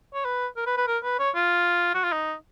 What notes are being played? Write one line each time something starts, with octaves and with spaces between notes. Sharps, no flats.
C#5
B4
A#4
B4
B4
A#4
B4
C#5
F4
F#4
F4
D#4